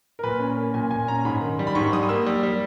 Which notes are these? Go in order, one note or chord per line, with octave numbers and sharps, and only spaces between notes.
A#4
A#2 B4
C#4
A#3
A#2 G#5
A#2 G#5
C#4 A#5
G#2 B5
D#3
G3
B5
G#2 C#6
G3 D#6
D#6
A#3 E6
G3
G3